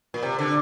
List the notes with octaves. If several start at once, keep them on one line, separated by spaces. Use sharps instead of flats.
A#2
C3
D3